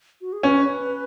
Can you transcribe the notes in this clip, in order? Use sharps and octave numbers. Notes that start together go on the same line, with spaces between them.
F#4
G#4
C#4 B4